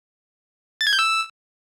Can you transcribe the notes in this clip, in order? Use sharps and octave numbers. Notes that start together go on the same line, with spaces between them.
A6
G#6
G6
E6